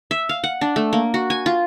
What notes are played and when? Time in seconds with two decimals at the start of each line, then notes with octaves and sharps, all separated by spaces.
0.11 E5
0.29 F5
0.44 F#5
0.61 D4
0.76 A3
0.93 A#3
1.14 F#4
1.30 G#5
1.46 F4